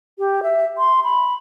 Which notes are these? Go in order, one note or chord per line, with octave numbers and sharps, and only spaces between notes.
G4
E5
C6
B5